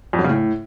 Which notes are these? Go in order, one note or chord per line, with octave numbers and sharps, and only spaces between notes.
F2
F#3
C#3
A2